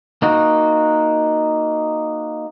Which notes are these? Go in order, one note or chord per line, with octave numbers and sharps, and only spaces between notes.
A#3 D#4 F#4